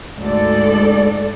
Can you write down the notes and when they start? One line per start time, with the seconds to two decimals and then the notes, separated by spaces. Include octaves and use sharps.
0.18 D2 G#2 A4 D5